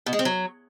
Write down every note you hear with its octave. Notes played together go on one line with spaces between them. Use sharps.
B2
G#3
C4
F#3